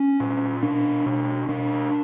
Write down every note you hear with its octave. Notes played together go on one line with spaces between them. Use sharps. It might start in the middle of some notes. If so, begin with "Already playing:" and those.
Already playing: C#4
A#2
B2 D4
B2
B2 D4